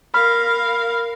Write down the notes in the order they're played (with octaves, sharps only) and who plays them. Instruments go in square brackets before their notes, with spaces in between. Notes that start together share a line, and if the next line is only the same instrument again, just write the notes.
[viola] A#4 F5 [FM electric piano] B5 [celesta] F6